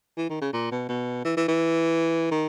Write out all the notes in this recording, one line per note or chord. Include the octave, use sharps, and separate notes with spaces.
E3
D#3
C#3
A#2
B2
B2
E3
E3
E3
D#3